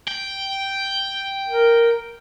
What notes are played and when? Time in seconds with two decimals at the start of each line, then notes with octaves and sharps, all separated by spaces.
0.07 G5
1.47 A#4